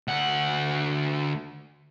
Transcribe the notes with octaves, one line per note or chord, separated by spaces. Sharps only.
D2 F#5